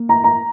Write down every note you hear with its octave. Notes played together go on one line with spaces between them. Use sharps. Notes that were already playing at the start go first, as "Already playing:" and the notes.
Already playing: A#3
A#5
A#5